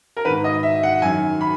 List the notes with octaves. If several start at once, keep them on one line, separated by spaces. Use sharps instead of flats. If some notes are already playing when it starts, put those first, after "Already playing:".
A#4
G#2 D#3 B4
D#5
E5
F#5
F#2 D#3 G#5
B5